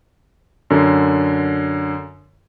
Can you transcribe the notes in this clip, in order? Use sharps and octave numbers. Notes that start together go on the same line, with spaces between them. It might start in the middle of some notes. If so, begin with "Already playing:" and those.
F#2 D3